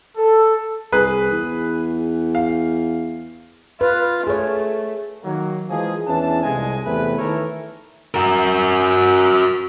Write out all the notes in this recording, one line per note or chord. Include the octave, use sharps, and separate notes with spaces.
A4
C2 G#4 B4
E2
F5
F4 B4
A3 G#4 C#5
D#3 F#3 A#3
E3 F3 G#3 A#3 G#4
E2 E3 C#4 D4 A5
C2 F2 G3 G#3 G#5
E2 C3 A3 B4
D#3 E3 A3 A4 A#4 C#5
F#4 A#4